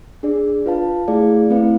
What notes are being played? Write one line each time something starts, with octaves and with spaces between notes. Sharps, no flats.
D4 G#4 D5
F4 B4 F5 A5
A3 E4 G#4 D5 F5
A3 C4 E4 B4 F5